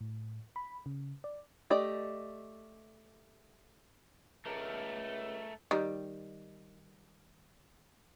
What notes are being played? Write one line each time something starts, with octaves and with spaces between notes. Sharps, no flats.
A2
B5
C#3
D5
A3 G4 D5 D#5
C#2 A3 A#4
D#3 G3